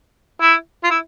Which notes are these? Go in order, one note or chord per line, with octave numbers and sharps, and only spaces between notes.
E4
F4
E4